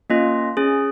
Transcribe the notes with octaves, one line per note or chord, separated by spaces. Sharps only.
A#3 C#4 F4 D#5
C#4 G#4